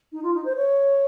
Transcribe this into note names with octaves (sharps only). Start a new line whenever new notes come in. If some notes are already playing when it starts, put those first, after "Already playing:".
D#4
F4
D#4
C5
C#5